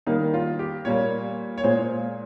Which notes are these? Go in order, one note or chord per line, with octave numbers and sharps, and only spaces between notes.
D#3 G3 A#3 D#4
F4
G4
A#2 G3 A#3 C#5
C#5
A#2 G#3 C5